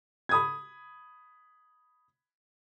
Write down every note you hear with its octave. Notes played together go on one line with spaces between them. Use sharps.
B5 D#6 G#6